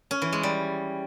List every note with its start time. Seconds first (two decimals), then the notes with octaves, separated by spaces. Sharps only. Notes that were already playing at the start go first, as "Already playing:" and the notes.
0.11 C#4
0.22 E3
0.33 G#3
0.43 G3